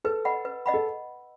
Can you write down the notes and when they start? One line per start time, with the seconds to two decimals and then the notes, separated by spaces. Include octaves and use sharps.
0.04 A4 B4
0.25 D#5 F#5 B5
0.45 B4
0.66 D#5 F#5 B5
0.74 A4